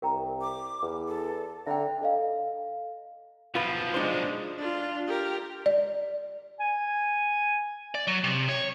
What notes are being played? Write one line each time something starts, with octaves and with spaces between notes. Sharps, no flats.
C2 A#4 G5 A#5
D6
E2
A4
D3 E5 G5 A#5
A4 D#5 F5
B1 F3 F4 B4
G#3 D4 D#4 C5
D4 F4
G4 A#4
D5
G#5
D5
F#3
C3
C#5